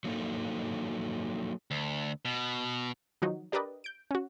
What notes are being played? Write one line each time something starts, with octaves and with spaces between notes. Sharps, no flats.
F#3 A#3 D#4 A4
D2
B2
D#3 F3 F#3 D#4 F#4
D4 G4 A#4 B4 D5 D#5
G6 D7
C#4 F#4